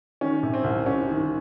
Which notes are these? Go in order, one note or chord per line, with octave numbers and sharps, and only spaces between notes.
D#3 C#4
C3
C4
C2
C2 C#4
D#3